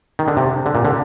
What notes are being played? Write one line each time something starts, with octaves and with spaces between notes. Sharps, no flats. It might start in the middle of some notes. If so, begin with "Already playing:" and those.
D#3
D3
C3
D3
A#2
D3